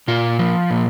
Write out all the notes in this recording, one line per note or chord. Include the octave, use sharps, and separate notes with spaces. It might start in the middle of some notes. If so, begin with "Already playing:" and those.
A#2 F4
F3
A#2